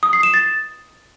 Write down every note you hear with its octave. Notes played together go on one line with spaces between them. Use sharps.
D#6
C7
E7
A6